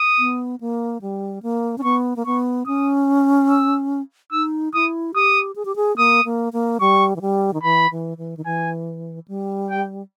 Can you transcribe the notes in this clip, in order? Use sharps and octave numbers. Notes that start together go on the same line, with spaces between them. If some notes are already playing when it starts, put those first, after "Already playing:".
Already playing: D#6
B3
A#3
G3
A#3
C#4
B3 C#6
A#3
B3 C#6
C#4 D#6
E6
D#4 E6
E4 D#6
G4 D#6
G#4
G4
G#4
A#3 D#6
A#3
A#3
G3 C#6
E3
G3
D#3
E3 B5
E3
E3
D#3
E3 G#5
G3
G5